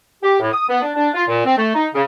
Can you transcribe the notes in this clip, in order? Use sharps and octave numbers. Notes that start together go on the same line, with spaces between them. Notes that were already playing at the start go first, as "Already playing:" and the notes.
G4
A2
D#6
B3
D4
D4
F4
A#2
C4
A3
D#4
C#3